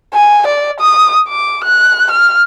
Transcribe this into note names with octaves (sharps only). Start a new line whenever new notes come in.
G#5
D5
D#6
D6
F#6
F6